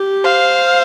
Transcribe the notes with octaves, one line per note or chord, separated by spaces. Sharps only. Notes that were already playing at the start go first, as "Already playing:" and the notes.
Already playing: G4
C5 F5